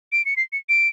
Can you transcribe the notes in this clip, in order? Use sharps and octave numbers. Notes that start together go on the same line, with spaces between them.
D7
C#7
C7
C#7
D7